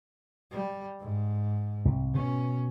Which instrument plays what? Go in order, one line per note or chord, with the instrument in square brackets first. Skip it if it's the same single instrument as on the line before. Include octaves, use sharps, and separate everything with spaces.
[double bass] G3
G#2
[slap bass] C2
[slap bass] B2 [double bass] C#4